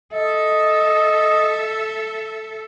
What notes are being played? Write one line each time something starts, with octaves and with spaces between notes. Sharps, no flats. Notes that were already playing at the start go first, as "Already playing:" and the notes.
A4 D#5 E5